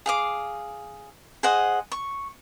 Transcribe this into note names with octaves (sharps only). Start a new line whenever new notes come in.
G#4 F5 D6
G#4 C5 D#5 F#5
C#6